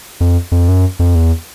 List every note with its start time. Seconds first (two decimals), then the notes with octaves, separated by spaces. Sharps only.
0.21 F2
0.52 F2
0.69 F#2
0.99 F2
1.15 E2